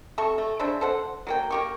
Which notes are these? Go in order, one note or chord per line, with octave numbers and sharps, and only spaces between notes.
C3 A4 E5 C#6
A3
C#3 D4 C5 E5
A4 C5 F#5
F#3 A#3 G5
A#3 G4 C#6